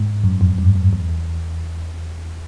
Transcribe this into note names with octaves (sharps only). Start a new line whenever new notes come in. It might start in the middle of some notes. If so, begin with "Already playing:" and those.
Already playing: G#2
F#2
F2
G2
F#2
E2